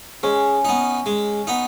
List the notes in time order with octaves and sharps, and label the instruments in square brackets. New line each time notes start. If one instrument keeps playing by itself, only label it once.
[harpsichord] G#3 [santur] C#4
[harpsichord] B3 D#4
G#3
B3 D#4